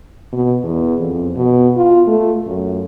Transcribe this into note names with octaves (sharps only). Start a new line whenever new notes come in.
B2
E2
F2
B2
F4
A3
F#2